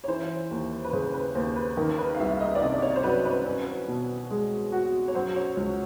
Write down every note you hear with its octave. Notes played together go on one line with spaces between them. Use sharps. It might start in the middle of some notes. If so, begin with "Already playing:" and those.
C#5
E3 C5
D#2
B4
C#3 C5
B4
D#2 C5
B4
D#3 A#4
B4
F5
C2 E5
D#5
D5
C3 D#5
C#5
C5
F#3 B4
B4
C#4
B2
G#3
F#4
C#5
F#3 C5
C#5
C#2